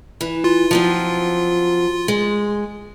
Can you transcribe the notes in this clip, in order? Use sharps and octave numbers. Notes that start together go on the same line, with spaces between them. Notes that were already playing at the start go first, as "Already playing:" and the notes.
E3
F4
F3 F#3 C4
G#3